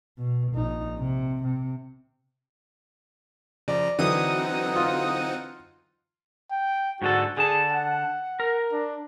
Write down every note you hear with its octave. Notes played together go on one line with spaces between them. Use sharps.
B2
A#1 D#4
C3
C3
C#3 F3 D5 A#5
D3 E3 F#3 C4 D#4 F#5 D#6
F4
G5
G#2 D3 F#4 A4
D3 G#4 A5
F#5
A#4
D4